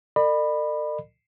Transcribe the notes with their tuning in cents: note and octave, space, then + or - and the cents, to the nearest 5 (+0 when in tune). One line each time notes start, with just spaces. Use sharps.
A4 +45 D5 +45 B5 +0